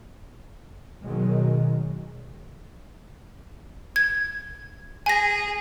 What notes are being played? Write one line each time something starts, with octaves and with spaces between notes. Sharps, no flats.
B2 D#3 F#3 G#3
G#6
G#4 G#5 A#6